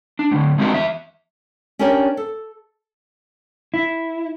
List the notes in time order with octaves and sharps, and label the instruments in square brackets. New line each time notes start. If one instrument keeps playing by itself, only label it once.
[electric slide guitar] D4
A2 D3
G#3 C4 D4 F#4 A#4
E2 E5
[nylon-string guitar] C#4 D4 G4 A#4 C#5 D5
A4
[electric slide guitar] E4